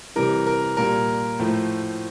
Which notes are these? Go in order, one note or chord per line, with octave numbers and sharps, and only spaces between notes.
C3 E3 G3 A#4
A#4
A#2 G3 A#4
A2 F3 A3